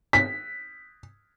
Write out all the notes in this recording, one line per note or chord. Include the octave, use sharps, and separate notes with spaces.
B6